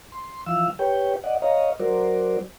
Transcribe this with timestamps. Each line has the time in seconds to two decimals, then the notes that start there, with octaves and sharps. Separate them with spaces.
0.12 C6
0.46 E3 F3 F5 E6
0.79 G4 B4 C#5 G5
1.24 D5 D#5 F#5
1.42 C#5 D#5 F5 A#5
1.80 F#3 F#4 A#4 C5 D5